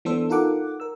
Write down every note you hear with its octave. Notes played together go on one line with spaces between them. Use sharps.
E3 B3 D4 A4 C5 E6
D#4 F4 A4 A#4 F#5 D6
A#4 E6